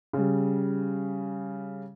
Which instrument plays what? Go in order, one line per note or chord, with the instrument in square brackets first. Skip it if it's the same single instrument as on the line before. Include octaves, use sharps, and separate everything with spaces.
[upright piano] C#3 G3